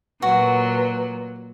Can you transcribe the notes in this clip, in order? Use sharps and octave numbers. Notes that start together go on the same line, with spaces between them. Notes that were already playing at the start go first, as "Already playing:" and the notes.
A#2 F#3 F#4 B4